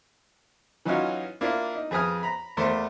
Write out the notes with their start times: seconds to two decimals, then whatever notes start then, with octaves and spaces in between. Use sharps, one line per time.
0.85 E3 F#3 C#4 D#4 F4 F#4
1.41 A#3 D4 E4 F4
1.76 D#4
1.91 F2 G#4 B4 G#5 D#6 F6
2.23 A#5 B5
2.57 E2 A3 A#3 C5